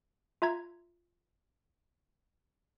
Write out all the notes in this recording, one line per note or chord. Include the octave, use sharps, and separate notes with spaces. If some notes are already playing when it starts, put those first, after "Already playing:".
F4 E5 A#5 G#6